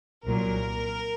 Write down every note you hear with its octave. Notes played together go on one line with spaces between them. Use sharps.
C2 A#2 F#3 A#4